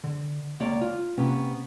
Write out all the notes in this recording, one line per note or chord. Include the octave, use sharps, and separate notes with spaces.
D3
C#2 A#3 C#5 D5
F4
C3 A#3 B3 C#4